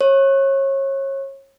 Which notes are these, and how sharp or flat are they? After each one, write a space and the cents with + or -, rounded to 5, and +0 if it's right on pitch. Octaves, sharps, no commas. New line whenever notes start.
C#5 -30